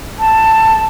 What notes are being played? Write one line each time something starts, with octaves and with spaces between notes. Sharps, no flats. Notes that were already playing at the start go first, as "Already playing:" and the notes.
A5